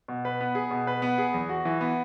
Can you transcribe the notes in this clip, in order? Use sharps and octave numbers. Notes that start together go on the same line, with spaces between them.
B2
B4
B3
G#4
B2
B4
B3
G#4
E2
F#4
E3
B3